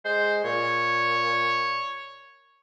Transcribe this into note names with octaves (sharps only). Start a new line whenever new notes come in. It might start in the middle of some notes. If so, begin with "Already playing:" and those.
G#3 C5
A#2 C#5